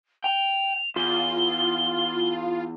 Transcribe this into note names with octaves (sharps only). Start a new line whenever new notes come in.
G5 F7
E2 F4 G7